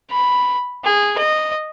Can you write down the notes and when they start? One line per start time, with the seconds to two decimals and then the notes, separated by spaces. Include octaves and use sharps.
0.11 B5
0.84 G#4
1.18 D#5